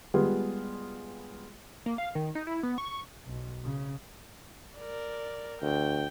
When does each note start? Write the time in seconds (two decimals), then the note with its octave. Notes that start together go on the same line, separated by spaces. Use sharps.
0.14 G3 G#3 B3 F4 G#4
1.86 A#3
1.98 F5
2.15 D#3
2.35 D#4
2.47 E4
2.63 B3
2.78 C#6
3.26 B1
3.63 C#3
4.77 A#4 D5
5.62 D2 G5